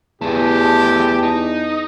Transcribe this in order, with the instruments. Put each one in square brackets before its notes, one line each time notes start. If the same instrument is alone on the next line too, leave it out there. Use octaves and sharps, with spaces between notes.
[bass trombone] E2 [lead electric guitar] A3 G#4 [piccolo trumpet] G4 [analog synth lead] A5
[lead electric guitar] D#4